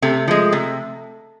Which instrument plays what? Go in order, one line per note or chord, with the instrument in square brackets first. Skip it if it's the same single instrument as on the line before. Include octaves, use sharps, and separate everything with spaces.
[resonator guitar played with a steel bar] C3 A3
F3 G#3
C3